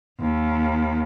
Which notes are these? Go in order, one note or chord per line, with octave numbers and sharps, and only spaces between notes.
D#2